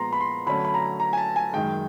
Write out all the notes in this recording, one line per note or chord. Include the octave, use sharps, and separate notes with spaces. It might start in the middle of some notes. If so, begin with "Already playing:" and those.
Already playing: A#2 F3 G#3 B3 A#5 C6
B5
C6
D3 F#3 A3 C#4 B5
B5
A#5
A#5
G#5
A5
G#5
F#2 D#3 G#3 G5